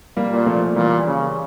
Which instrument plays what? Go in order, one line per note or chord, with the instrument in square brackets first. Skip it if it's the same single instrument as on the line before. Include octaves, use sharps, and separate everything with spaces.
[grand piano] G3 A#3
[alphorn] A#2
[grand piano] F3 A3
[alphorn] A#2 [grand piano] E3 G3
[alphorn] C#3